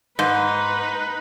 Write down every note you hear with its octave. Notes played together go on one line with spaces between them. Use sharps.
G#2 D#4 B4